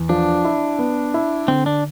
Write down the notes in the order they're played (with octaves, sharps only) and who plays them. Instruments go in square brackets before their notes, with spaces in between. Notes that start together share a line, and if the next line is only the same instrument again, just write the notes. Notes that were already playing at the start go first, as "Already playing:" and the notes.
Already playing: [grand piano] E2
[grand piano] F3 [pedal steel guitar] D4
[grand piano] E4
B3
E4
[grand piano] D3 [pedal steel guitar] C4
[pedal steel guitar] D4